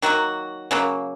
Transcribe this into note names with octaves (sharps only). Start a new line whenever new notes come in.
D#3 F#3 A#3 F#4
C#3 F#3 A#3